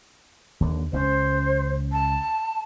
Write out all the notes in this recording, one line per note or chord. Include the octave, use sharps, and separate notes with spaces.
D#2 D3
C#2 C4 C#4 C5
A5